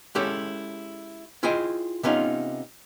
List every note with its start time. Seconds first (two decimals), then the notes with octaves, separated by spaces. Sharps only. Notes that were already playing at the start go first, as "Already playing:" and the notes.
0.15 G#3 C#4 E4 G4 A4 C#5
1.43 E4 F4 G#4 C5 D#5 G5
2.03 C3 B3 C#4 D#4 F4